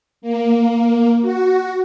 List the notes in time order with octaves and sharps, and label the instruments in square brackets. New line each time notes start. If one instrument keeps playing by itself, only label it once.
[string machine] A#3
F#4